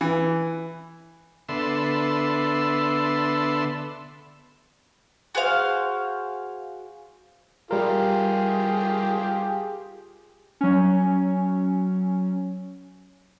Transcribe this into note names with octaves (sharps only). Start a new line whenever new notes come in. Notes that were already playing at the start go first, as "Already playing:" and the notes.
E3
D3 B3 A4 E5 C6
F#4 G#4 C5 F5
G3 F4 G4 G#4 A#4
F#3 C#4